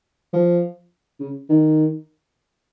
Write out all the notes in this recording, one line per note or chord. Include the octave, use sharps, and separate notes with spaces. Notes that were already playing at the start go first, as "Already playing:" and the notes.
F3
C#3
D#3